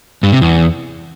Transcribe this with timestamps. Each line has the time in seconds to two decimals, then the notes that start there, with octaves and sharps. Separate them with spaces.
0.23 G2
0.32 C3
0.41 E2